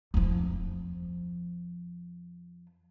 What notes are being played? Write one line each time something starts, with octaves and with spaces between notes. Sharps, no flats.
F2 F3